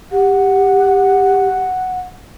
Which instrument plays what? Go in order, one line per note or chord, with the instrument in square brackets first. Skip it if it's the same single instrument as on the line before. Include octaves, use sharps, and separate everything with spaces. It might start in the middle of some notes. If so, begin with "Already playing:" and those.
[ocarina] G4 [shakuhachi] F#5